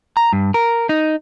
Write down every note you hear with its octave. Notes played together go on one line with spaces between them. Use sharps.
A#5
G2
A#4
D#4